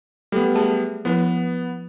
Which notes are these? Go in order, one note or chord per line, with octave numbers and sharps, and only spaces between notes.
F#3 G3 A3 B3 A4
A3 G#4 A5
F3 B3 E4 B4